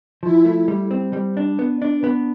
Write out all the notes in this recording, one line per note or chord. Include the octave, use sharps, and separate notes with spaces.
F3 E4
A3
G3
C4
G3
D4
B3
D4
B3